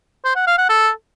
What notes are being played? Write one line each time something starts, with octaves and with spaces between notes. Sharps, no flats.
C5
F#5
F5
F#5
A4